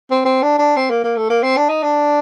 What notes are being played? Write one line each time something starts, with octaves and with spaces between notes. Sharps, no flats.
C4
C4
D4
D4
C4
A#3
A#3
A3
A#3
C4
D4
D#4
D4